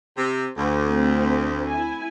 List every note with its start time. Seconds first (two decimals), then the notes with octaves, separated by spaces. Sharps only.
0.17 C3
0.57 D2
0.87 A3 C4
1.68 E4 G#5